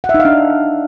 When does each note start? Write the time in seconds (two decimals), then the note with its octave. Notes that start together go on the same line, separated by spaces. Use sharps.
0.04 F#5
0.09 E5
0.14 D#4
0.20 F5
0.25 D4